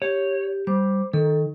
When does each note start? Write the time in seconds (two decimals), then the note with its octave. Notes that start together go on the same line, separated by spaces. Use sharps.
0.02 G4 C#5
0.67 G3 C5 D6
1.13 D#3 A4